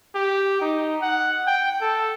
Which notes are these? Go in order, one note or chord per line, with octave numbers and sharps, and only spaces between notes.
G4
D#4
F#5
G5
A4